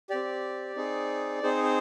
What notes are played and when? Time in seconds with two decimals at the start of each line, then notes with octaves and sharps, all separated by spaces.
0.10 C4 G4 D5
0.76 C4 D#4 G#4
1.43 C4 D#4 G#4 C5
1.64 C5